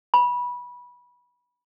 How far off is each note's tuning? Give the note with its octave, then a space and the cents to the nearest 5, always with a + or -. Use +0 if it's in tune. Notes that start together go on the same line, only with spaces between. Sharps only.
B5 -20